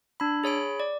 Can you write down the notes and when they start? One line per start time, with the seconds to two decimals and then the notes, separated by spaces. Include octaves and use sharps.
0.20 D4 B5
0.44 G#4 C#5 B5 D7
0.80 D5